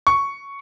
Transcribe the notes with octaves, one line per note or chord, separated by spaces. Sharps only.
C#6